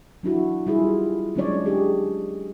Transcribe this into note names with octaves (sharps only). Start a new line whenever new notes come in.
F#3 D4 E4 F#4
G3 E4 F4 G#4
F#3 G#3 C#4 D4 C#5 D5
D4 G4 G#4